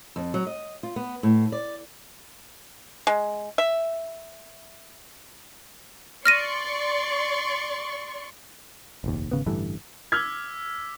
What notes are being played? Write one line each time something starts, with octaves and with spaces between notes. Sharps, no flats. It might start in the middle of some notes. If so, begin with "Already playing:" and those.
F2
F#3
D#5
F4
B3
A2
D5
G#3
E5
D5 C6 C#6 F6 A#6 D#7
F1 A#1 D#2
G#1 C#3 B3
A1 G2 D3 E3
D6 E6 F6 G#6 B6